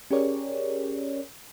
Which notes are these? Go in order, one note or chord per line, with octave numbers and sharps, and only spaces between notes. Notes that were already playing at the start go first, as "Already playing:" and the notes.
C#4 G4 G#4 A#4 C#5 D5